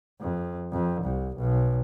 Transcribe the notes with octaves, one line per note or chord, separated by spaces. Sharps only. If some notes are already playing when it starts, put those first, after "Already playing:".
F2
F2
C2
B1